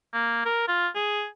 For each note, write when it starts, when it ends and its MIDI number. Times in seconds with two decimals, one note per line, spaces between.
0.13 0.43 58
0.45 0.66 70
0.68 0.88 65
0.95 1.26 68